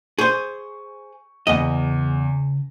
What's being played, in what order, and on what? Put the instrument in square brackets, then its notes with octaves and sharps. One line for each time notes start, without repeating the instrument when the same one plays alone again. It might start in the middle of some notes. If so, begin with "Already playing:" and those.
[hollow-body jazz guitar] G#4 C5 [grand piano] C#6
[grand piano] E2 [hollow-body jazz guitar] C#3 D#5